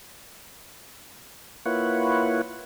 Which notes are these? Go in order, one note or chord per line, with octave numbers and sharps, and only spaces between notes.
A#3 E4 F4 B4 C#5 F#5